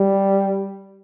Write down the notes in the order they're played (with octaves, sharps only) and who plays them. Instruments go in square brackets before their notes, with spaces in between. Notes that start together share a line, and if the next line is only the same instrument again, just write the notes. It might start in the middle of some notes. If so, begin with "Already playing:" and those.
Already playing: [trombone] G3